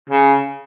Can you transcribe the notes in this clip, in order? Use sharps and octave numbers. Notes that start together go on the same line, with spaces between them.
C#3